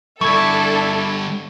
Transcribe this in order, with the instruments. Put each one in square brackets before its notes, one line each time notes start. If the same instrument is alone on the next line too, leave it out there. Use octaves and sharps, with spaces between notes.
[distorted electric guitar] D3 G3 [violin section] D4 A4 [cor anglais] E4 [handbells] C#6 G#6